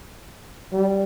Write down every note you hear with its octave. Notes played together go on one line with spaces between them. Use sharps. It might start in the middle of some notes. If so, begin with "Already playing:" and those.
G3